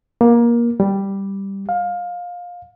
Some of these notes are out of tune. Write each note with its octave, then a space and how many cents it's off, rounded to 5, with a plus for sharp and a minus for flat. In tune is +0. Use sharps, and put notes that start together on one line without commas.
A#3 +20
G3 +0
F5 +20